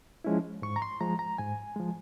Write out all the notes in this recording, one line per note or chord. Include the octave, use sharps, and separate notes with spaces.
F3 G#3 C#4 E4
G#2 C#6
A#5
C6
F3 G#3 A#5
A#5
G#2 G#5
F3 G#3